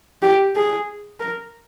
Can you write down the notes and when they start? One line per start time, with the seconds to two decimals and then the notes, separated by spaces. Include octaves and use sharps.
0.22 G4
0.56 G#4
1.20 A#4